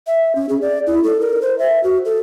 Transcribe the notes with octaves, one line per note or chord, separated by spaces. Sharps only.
E5
C#4
G#4
D5
E4
A4
A#4
C5
E5
F#4
A4